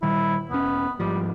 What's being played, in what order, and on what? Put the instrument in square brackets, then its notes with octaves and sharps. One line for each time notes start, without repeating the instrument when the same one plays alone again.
[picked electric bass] A#2 D#3 G3 [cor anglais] E4
[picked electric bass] E1 C#4 [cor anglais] B3
[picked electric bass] G#1 G#2 F3 [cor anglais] G3